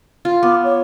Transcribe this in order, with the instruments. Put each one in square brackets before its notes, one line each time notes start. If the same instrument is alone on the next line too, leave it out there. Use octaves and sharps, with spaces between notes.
[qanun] F4
[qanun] B3 [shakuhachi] D6
[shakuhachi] C#5